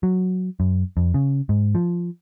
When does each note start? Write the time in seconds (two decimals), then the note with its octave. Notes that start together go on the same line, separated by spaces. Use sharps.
0.03 F#3
0.60 F#2
0.97 F2
1.14 C#3
1.49 G#2
1.75 F3